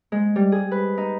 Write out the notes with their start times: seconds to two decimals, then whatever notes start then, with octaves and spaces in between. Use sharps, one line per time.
0.12 G#3
0.36 G3
0.52 G#4
0.71 B4
0.98 D#4